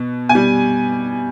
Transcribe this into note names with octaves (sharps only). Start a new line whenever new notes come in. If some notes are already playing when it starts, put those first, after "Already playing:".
Already playing: B2
B2 G#5
G3